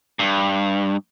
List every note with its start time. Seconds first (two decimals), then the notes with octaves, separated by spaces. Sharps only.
0.19 G2